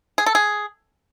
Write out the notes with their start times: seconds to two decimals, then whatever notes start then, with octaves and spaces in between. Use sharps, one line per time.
0.18 G#4
0.26 A4
0.35 G#4